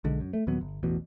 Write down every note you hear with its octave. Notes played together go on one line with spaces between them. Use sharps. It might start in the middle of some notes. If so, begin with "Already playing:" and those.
B1 D3 G#3
F#2
A3
D#2 A#2 F#3 B3
G1
A1 E2 B2